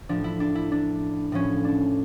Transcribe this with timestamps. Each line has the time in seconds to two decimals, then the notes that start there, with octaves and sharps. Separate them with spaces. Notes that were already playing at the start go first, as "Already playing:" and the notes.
0.09 A2 F3 D4
0.24 E4
0.40 D4
0.55 E4
0.72 D4
1.32 A2 F3 C#4
1.65 D4